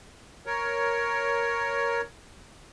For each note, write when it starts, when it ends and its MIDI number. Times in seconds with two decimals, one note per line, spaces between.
0.46 2.01 70
0.46 2.01 73